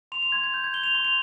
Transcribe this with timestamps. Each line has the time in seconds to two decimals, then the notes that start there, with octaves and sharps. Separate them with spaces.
0.12 C6 F7
0.22 F7
0.32 C6 G#6
0.44 G#6
0.54 G6
0.64 G#6
0.73 G6 G7
0.84 F7
0.95 C6 G7
1.05 F7